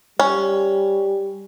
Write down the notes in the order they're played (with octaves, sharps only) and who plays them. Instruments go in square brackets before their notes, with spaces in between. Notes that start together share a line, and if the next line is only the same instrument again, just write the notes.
[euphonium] G3 [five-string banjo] C#4